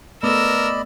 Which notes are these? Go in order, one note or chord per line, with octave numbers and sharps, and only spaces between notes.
A3 B3 A#4 B4 D5 D#5 B5 E6